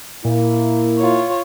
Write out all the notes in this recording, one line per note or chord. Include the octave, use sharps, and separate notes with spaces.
A#2 A#3 E4
F4 C#5